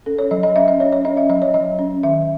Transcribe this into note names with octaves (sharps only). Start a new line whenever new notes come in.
C#4 A4
C#5
F#3 D#5
D#5
C#4 E5
D#5
C#4 C#5
C#5
C#4 D#5
E5
F#3 D#5
C#5
F#3 D#5
C#4
D#3 E5